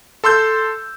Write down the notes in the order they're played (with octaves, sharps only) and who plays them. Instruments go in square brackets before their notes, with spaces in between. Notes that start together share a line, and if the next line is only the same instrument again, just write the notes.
[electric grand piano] A4 C6 E6 G6